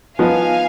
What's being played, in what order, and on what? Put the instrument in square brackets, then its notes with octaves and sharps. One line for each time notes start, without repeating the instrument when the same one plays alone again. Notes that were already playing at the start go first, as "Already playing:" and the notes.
[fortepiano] F3 B3 D#4 [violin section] F5 G#5